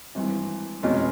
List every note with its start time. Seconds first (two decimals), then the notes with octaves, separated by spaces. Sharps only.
0.15 G#1 G2 E3
0.83 F1 E2 B2 G#3 C#4